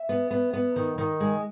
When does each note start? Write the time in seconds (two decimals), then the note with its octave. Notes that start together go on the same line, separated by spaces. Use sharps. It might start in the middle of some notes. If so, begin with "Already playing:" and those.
Already playing: E5
0.09 B3
0.31 B3
0.53 B3
0.76 D#3
0.98 D#3
1.20 G#3